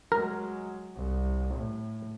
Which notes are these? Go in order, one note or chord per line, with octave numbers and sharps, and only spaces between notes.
F#3 G#3 A#4
C2
A2